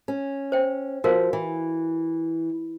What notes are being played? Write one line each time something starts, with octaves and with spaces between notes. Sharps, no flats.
C#4
C5 G5
F3 F#4 A#4 F5
E3